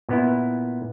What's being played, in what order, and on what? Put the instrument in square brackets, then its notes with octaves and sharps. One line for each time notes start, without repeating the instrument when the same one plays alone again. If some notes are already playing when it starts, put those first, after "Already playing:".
[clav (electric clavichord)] A#2 B3 E4